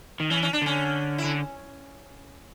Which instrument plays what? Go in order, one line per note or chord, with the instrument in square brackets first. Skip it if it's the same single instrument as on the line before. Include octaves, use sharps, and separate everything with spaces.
[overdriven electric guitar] D#3
[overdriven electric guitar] E3 [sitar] C#4
[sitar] C#4
D4
[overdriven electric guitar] D3 [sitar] C#4
[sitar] E4
[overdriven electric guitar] D3